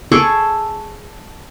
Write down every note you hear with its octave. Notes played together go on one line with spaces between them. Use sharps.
G#4 A4 C#6 D6